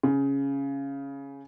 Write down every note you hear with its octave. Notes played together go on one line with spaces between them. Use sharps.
C#3